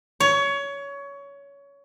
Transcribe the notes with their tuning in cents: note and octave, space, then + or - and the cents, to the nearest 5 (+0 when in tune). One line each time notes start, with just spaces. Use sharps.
C#5 +20